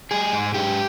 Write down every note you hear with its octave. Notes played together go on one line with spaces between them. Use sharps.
G3 G#4
G#2
G#2 G4